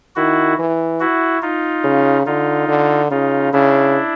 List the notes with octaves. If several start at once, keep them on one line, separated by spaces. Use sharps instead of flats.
D#3 E4 F#4
E3
E4 F#4
D#4 F4
C#3
D3 D#4 F4
D3
C#3 D#4 F4
C#3 D4 E4